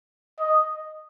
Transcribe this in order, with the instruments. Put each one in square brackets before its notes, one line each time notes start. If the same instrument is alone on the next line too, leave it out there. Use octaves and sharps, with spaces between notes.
[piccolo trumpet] D#5